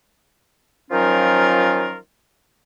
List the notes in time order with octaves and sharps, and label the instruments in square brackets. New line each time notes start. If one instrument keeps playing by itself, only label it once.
[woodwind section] D#3 F3 F#3 C#4 F4 A#4